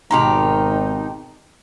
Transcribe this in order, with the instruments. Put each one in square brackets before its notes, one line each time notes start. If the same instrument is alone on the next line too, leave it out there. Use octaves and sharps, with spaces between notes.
[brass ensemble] G#1 [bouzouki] B2 D#3 G4 [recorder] D#4 [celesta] A#5 C6 F7